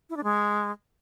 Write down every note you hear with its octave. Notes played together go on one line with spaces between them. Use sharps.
E4
D4
G#3